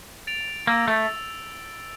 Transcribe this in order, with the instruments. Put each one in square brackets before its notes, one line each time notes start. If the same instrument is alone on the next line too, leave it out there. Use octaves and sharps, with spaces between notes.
[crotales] A6 D7 F7
[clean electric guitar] A#3 [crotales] E6
[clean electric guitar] A3